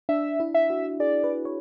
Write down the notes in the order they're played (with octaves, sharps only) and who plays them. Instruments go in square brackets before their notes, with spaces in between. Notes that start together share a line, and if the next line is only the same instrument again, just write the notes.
[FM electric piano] D4 [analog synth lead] E5
[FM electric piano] E4
[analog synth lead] E5
[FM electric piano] F#4
[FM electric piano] G#4 [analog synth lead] D5
[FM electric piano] B4
C#5